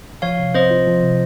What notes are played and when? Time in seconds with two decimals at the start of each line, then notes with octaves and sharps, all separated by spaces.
0.22 F3 C#5 F5
0.39 C3
0.54 C4 C5 D#5
0.71 F4
0.87 F3
1.03 C3